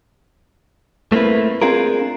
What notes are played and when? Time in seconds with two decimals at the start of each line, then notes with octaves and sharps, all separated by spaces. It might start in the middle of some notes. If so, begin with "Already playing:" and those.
1.12 A3 A#3 C4 E4 B4
1.62 C4 D4 F4 G#4 A#4